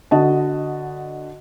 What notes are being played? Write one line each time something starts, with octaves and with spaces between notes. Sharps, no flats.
D3 F#4 D#5 A5